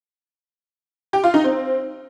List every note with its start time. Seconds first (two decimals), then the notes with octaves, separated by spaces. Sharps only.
1.13 G4
1.24 F4
1.34 D#4
1.44 C4